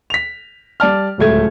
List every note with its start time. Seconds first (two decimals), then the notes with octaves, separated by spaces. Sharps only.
0.10 B6 F7
0.80 G3 D5 A5 F6
1.18 D1 C#2 A3 G#6